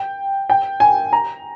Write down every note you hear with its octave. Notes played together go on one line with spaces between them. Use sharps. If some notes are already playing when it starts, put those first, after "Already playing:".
Already playing: G5
G5
G#5
A#5